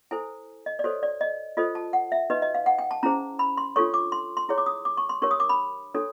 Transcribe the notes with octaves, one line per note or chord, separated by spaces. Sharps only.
E4 A4 C5 G#5
D#5
D5
F#4 A4 C5 C#5
D5
D#5
F4 A4 C5 D#5
A5
F#5
E5
D#4 F#4 B4 D#5
D#5
F5
F#5
G5
A5
C#4 E4 G#4 C5 A#5
B5
C6
D4 F4 A4 C#5 C#6
D6
C6
C6
E4 G#4 C#5
D6
D#6
D6
C#6
C6
D4 G4 A#4 C#5 C#6
D#6
D6
B5
D4 F#4 A4 C#5